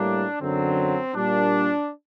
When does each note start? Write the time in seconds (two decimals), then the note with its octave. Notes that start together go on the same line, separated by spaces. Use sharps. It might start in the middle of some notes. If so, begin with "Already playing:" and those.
Already playing: A2 G3 A#3 D4
0.41 F#2 D3 F#3 C4
1.14 A#2 G3 A#3 D4